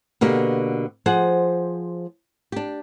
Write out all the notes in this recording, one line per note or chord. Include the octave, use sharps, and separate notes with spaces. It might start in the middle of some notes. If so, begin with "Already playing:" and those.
B2 D3 A#3 G4
F3 G#4 C5 F#5
D4 G4